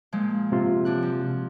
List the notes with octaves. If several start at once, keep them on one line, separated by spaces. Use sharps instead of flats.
A#2 F3 G#3
C3 F4
F#2 D4 F#6
F3